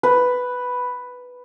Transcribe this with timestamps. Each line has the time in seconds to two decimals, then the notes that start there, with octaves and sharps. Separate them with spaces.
0.03 B4